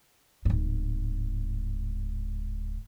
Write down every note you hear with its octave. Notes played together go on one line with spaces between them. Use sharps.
D1 G#2